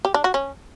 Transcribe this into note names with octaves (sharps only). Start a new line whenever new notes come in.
G4
D4
F#4
C#4